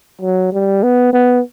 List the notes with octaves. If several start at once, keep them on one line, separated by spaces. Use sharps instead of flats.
F#3
G3
B3
B3